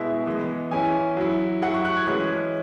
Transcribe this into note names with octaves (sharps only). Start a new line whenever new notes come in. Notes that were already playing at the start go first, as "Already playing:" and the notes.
Already playing: B2 G#3 B3 E4 E5
E3 G#3 B3
E3 C#4 E4 G#5
F#3 E4
F#3 E4 F#5
C#6
F#6
G#6
E3 G#3 C#4 E4 F#6